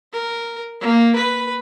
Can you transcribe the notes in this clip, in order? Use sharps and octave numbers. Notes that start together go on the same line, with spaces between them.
A#4
A#3
B4